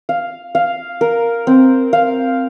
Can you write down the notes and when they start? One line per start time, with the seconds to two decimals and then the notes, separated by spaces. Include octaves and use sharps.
0.09 F5
0.55 F5
1.01 A#4
1.47 C4
1.93 F5